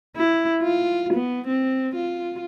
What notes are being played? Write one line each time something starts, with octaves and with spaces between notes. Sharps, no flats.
E4
F4
B3
C4
F4